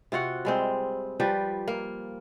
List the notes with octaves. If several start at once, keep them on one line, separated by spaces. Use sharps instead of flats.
C3 F4 F#4 F#5
G3 G#3 C4
F3 G3 G4 B4
A#3